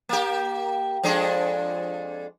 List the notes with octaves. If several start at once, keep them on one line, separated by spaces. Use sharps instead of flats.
A#3 G4
F2 G#3 D4